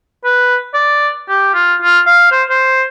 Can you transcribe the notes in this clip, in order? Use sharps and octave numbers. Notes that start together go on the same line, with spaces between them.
B4
D5
G4
F4
F4
F5
C5
C5